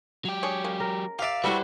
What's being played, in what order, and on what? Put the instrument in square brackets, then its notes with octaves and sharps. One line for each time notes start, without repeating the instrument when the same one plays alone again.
[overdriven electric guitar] F#3 G4
[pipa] D4 G#4 C#5
G#3 A#3 C#4
[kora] A#4
[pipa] G4 E5 [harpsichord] D5 F5
[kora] G3 E4 F#5 [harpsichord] A3 F#4 [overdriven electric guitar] B4 C5